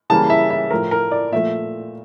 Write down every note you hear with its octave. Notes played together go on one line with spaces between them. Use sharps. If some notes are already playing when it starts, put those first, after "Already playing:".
C#3 E3 G3 A#3 A5
E5
E5
A2 F3 A3 A#4
A#4
D5
A#2 F3 A3 E5